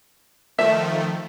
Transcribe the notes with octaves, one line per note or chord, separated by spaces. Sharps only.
D#3 F3 A3 E5